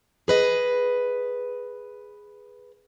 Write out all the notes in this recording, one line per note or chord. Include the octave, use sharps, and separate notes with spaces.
G#4 B4 D#5